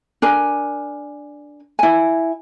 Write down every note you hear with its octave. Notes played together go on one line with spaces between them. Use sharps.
D4 A#4 G#5
E4 G#5